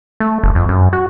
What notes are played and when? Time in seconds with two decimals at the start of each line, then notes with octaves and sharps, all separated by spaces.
0.20 A3
0.43 F#1
0.55 F2
0.69 F#2
0.93 F#4